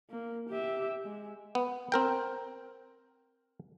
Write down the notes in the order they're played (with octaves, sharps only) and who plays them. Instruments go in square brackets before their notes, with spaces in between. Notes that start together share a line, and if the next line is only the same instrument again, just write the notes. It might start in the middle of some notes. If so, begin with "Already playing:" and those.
[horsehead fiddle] A#3
G4 E5
G#3
[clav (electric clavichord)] B3
C4 A#4 G5